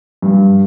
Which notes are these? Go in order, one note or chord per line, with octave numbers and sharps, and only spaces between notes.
G2